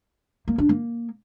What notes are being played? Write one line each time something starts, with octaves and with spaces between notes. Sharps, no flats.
A#3
D4
A#3